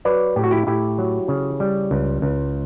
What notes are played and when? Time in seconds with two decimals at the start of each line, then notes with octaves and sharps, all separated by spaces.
0.05 F#3 B4 D5
0.36 A2 G4
0.44 F#4
0.51 E4 G4
0.67 A2 E4 G4
0.98 F#3
1.28 C#3
1.60 G3
1.91 C#2
2.22 C#2